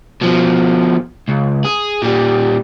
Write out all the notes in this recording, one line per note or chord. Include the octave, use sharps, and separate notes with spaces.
B2 F3
C#2
G#4
A#2 G3